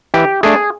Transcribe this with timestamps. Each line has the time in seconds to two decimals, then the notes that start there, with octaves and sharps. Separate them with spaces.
0.14 E3 G4
0.43 A3 D4 G#4